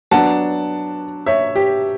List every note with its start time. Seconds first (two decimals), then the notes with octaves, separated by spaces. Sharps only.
0.11 F#3 B3 D4 F#5 A5
1.26 C#5 E5
1.55 G4